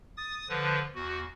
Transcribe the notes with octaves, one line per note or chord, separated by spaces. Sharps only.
D#6 A6
D3 F3 B4
E2 F#4